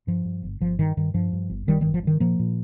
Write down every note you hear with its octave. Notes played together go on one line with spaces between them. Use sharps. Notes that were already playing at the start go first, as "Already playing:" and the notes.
G2 F3
G2
G1
G1 F3
G2 D#3
G2 D#3
G2 F3
G2
G1
G1 D#3 G3
G2 D#3 G3
F3
G2 D#3
A#2 F3 A#3
A#2